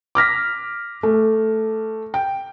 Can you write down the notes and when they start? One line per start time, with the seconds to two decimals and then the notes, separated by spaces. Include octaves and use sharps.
0.15 D6 F6 A#6 B6
1.03 A3
2.14 G5